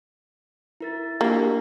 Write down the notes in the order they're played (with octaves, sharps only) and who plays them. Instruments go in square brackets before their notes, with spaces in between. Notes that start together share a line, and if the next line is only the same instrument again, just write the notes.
[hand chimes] E4 A#4 A6
[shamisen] A#3 [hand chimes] D4 F4 G4